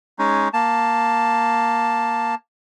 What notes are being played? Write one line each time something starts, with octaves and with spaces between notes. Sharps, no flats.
G#3 C#4 D#4
A#3 A5